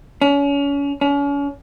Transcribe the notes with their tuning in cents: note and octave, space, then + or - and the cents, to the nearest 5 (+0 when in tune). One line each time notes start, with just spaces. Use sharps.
C#4 +35
C#4 +40